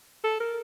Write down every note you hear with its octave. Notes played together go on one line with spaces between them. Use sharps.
A4
A#4